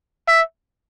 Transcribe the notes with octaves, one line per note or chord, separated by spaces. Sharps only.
E5